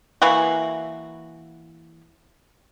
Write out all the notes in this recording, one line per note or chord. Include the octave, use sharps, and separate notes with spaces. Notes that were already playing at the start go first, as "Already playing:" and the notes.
E3 A#3 E4 F#4